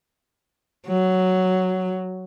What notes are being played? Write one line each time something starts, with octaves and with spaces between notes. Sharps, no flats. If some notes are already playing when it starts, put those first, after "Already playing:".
F#3